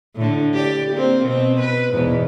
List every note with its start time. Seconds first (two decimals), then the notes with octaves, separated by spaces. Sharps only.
0.16 A2 D3
0.53 G4 D5
0.93 A#3 C4
1.24 B2 C4
1.59 B4
1.93 E2 G#2 B2